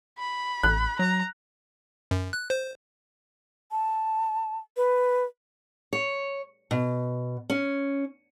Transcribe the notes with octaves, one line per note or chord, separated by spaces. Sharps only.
B5
A1 F#6
F#3 A#5
F#2
F#6
C5
A5
B4
C#5
B2
C#4